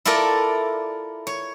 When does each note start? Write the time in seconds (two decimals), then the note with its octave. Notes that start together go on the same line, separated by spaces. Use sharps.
0.05 E4 F4 A4 A#4 D5
1.27 C#5